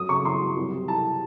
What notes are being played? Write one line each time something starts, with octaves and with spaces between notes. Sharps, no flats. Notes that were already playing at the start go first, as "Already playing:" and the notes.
Already playing: F#2 D#6
C#3 C#6
E3 C6
F#2
C2
C3
E3 A5